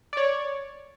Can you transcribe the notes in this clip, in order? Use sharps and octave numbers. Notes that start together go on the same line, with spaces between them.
C#5 D5